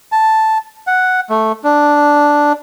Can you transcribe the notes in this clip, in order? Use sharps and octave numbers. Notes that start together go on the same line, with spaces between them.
A5
F#5
A3
D4